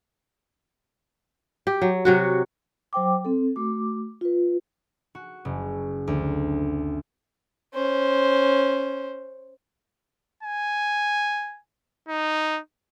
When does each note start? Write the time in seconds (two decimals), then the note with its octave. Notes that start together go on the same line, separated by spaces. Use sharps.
1.67 G4
1.82 F#3
2.05 C3 F#3 F#4
2.93 F#3 C5 G5 D6
3.25 C4 A4
3.56 A3 F#4 D6
4.21 F4 B4
5.15 F#4
5.45 F#1
6.08 D2
7.74 C#4 C5
10.43 G#5
12.08 D#4